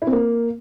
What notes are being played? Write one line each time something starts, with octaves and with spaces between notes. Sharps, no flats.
E4
C4
A#3